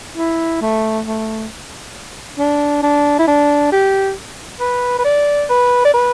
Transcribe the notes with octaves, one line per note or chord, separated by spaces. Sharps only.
E4
A3
A3
D4
D4
E4
D4
G4
B4
B4
D5
B4
D5
B4